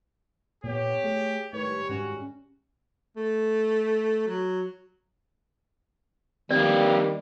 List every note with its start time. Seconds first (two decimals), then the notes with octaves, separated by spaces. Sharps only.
0.64 A#2 B3 G4 C#5
1.04 A3 G#4
1.53 A2 D#3 G3 G#3 B4 C#5
1.89 G#2 C#4 F#4
3.16 A3
4.27 F#3
6.51 D#3 G3 A#3 C4 D5